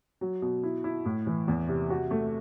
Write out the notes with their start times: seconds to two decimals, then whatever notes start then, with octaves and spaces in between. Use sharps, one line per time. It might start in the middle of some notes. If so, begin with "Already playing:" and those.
0.21 F#3
0.42 B2
0.63 E4
0.84 E4
1.06 A2
1.27 E3
1.48 E2
1.69 C3
1.90 F#4
2.11 A3